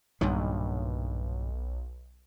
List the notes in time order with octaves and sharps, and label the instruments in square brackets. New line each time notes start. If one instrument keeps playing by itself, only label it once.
[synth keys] B1 [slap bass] G2 A#2 D#3